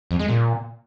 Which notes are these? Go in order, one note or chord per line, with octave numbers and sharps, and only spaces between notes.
F2
G#3
A#2